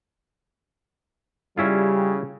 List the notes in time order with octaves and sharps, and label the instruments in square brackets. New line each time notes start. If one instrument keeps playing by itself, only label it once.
[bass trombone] C#3 [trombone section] G3 [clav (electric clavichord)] C#4 E4 F4